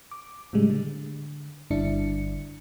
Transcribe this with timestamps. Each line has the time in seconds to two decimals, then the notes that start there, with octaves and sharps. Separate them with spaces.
0.11 D6
0.53 A2 C#3 G3 G#3
0.70 D3
1.70 G1 G2 D3 D4 E4 C#7